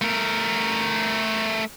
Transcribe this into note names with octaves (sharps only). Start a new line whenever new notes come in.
A3 A#4